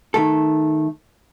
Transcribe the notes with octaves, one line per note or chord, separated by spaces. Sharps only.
D#3 A3 A4